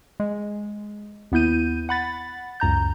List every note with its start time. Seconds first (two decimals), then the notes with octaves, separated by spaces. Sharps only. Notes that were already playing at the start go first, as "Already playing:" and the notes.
0.20 G#3
1.32 D#2 B3 E4 G6 D#7
1.89 F#5 B5 A6
2.60 C#2 F#2 A#5 G6